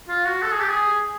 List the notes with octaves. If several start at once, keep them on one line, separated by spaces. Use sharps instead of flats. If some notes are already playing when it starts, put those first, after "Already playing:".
F4
F#4
A4
G#4
G4
G#4